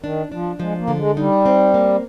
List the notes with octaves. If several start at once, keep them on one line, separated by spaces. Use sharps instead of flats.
D#3 D4
F3 D4
F3 G#3
A#3
D3
G#3
G3 D#4
C4
A#3